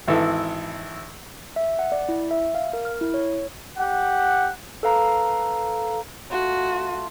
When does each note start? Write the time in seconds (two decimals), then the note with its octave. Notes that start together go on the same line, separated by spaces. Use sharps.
0.08 G#1 E3 E4 A4 E6
1.56 E5
1.79 F#5
1.92 D5
2.09 E4
2.31 E5
2.55 F5
2.73 A#4
2.85 F6
3.01 E4
3.14 C#5
3.78 G4 F#5
4.83 A4 B4 F5 A#5
6.31 A3 F4 F#4